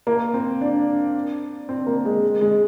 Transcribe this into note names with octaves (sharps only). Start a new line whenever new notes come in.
A#3
C4
D4
C4
A#3
G#3
G#3